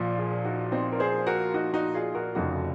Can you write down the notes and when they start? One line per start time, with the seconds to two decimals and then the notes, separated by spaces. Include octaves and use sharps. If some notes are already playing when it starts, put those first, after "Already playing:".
Already playing: A#1 A#2 F3
0.18 F4 G#4
0.45 D#4 F#4
0.72 C4 D#4
0.92 A#4
1.00 G#4 C5
1.27 F#4 A#4
1.54 D#4 F#4
1.74 D#4 F#4
1.94 F4 G#4
2.15 F#4 A#4
2.35 F1 F2 C#3 F3 D#4 F#4